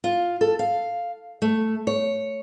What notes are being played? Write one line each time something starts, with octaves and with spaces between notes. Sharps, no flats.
F4
A4
F5
A3
C#5